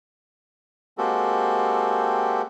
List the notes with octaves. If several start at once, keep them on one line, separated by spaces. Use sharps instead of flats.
G#3 A#3 C4 F#4 G4 A4